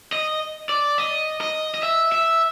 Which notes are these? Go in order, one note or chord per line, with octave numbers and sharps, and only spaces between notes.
D#5
D5
D#5
D#5
D#5
E5
E5